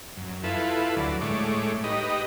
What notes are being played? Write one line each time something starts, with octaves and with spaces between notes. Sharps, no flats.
F#2
E4 F4 A4 B4
D2 F#3 D5
A2 G#3 A3 C#5 D6
D#4 G4 B4 D#5